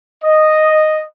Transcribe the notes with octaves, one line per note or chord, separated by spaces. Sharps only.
D#5